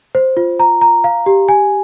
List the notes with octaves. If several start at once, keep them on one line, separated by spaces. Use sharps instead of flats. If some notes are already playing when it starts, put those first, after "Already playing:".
C5
F4
A#5
A#5
F5
G4
G#5